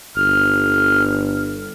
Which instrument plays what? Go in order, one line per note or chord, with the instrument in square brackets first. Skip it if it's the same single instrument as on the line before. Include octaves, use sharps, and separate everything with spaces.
[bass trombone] G1 [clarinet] F6